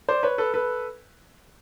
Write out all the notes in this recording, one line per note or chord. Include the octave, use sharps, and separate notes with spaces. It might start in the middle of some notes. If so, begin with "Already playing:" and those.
C5 D5
B4 C#5
A4 B4
A4 B4